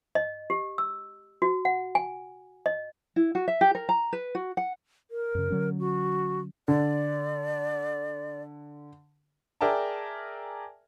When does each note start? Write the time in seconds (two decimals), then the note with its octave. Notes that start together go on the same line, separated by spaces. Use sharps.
0.15 D#5
0.50 G4
0.78 E6
1.42 F#4
1.65 F#5
1.95 G#5
2.66 D#5
3.16 E4
3.35 F#4
3.48 E5
3.61 G4
3.75 A#4
3.89 A#5
4.13 B4
4.35 F#4
4.57 F#5
5.11 A#4
5.35 F#2 C#3
5.50 D3 F#3 C#4
5.80 F#4
6.68 D3 D5
9.61 G#4 A#4 D5 E5 G5 A5